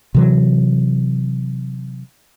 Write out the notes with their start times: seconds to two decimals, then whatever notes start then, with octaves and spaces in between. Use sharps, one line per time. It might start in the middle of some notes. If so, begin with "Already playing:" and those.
0.15 C3 E3 F#3